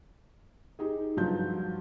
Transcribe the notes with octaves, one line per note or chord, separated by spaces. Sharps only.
D#4 G4 G#4
G2 F3 F#3 F4 G6